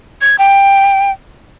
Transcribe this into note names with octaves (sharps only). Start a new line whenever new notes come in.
G#6
G5